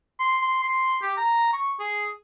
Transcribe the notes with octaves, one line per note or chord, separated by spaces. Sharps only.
C6
C6
C6
G4
A#5
C#6
G#4